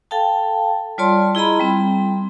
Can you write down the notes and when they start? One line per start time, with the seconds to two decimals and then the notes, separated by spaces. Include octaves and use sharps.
0.11 A4 F5 G5 A5
0.98 G3 F4 C#5 D5 A5 C6
1.35 E4 G#4 D#5 A#5 B5
1.60 G3 C4